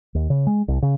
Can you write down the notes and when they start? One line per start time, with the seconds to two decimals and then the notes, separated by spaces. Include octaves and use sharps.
0.15 D#2
0.30 C#3
0.47 G#3
0.68 C2
0.82 C#3